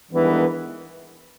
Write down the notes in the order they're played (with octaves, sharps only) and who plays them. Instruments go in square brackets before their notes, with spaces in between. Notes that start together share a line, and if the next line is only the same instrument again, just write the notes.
[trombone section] G2 D#3 G#3 B3 [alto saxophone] E3